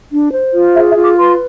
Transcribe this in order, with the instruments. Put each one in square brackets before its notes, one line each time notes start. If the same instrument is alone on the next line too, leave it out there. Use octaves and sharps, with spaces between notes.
[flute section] D4
C5
F4
G#4 E5
E5
F4
D6
B4 C6